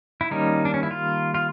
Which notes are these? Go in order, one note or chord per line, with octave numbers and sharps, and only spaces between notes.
E4
D#3 G3 A#3 C#4 D#4
D4
C#4
E4
F4
F4